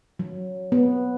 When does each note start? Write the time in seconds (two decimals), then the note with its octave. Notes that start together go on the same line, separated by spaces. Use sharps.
0.19 F#3
0.72 B3